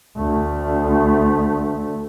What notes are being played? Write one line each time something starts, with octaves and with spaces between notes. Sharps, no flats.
D2 A3